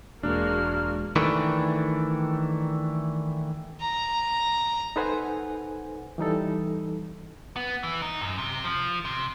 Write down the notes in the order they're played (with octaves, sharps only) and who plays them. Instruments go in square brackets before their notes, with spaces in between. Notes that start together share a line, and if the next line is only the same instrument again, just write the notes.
[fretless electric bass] E1 [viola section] G#3 A#3 F#4 [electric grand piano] D4 [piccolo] F6
[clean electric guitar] D#3 E3 A3 D4
[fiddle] A#5
[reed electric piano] D#4 A4 B4 C5 F#5 G#5
E3 G3 D#4 A4
[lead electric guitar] B3
E3
D#4
F#2
C3
F3
C3